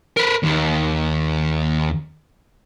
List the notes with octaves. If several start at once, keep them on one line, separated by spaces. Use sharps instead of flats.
A#4 B4
D#2